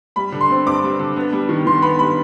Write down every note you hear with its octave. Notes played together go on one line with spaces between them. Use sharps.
G3 B5
D3
C6
C4
G2 D6
G3
D3
B3
G3
D#3
D#3 C6
B3 B5
G3 B5